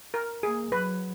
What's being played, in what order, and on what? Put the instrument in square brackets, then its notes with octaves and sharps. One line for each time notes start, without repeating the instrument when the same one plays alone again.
[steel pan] A#4
[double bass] A#3 [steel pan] G#4
[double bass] F#3 [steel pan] B4